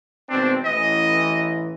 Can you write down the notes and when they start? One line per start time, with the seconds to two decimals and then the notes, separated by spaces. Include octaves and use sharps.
0.29 G#1 B2 C4 D4
0.65 A1 E3 D#5